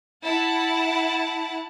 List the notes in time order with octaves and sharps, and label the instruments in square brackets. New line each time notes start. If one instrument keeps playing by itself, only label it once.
[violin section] E4 F#5 A5